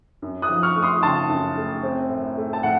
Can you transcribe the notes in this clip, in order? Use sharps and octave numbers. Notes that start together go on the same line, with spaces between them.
F#2
D#6 F#6
F3
C#6 F6
A3
C6 D#6
C#3 A5 C6
F#2
A3
C4
A2
A3
A5
A2 F#5